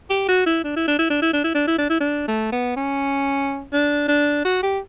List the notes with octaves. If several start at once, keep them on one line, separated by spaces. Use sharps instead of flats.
G4
F#4
E4
D4
E4
D4
E4
D4
E4
D4
E4
D4
E4
D4
E4
D4
A3
B3
C#4
D4
D4
F#4
G4